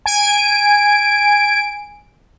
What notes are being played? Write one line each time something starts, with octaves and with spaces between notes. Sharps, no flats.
G#5 D7